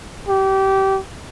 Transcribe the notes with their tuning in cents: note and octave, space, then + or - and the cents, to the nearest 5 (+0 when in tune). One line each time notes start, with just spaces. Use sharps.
G4 -25